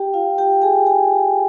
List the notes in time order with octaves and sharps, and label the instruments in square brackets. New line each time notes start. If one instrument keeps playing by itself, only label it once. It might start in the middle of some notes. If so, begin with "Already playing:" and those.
Already playing: [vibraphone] G4 G5
F4 F5
G4 G5
G#4 G#5
G#4 G#5